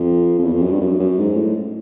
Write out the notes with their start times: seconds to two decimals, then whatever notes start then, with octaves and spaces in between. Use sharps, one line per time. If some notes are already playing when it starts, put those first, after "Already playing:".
Already playing: F2
0.39 F2
0.44 E2
0.53 F2
0.62 F#2
0.72 G2
0.81 F#2
1.00 F#2
1.18 G#2
1.37 A2